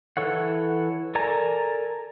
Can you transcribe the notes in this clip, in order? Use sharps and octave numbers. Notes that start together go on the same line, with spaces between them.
E3 A4 C#5 F#5
A4 A#4 D5 G#5 A#5